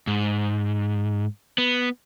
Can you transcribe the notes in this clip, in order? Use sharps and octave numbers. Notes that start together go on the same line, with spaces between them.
G#2
B3